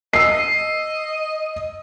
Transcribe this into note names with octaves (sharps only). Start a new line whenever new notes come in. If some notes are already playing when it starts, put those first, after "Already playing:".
D#5 E6 C7